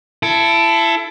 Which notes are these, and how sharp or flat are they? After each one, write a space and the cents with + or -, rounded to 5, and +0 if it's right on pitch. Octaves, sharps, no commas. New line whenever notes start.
E4 +25 A4 +0